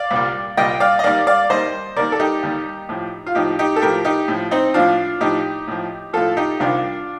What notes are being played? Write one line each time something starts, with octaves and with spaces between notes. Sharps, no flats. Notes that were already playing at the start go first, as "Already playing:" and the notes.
Already playing: D5 F5
C2 A#2 G3
C2 A#2 G3 D#5 G5
D5 F5
D#5
D#2 D#3 G3 D5 F5
D5 F5
D#2 D#3 G3 C5 D#5
D#2 D#3 G3 A#4 D5
A4
D#4 G4
D#2 D#3 G3
A2 F3
F4
A2 F3 D#4 G4
D#4 G4
A4
A2 F3 G4 A#4
D#4 G4
A2 F3
C4 D#4
A2 F3 D4 F4
A2 F3 D#4 G4
A2 F3
A2 F3 F4 A4
D#4 G4
C2 C3 D#3 D4 F4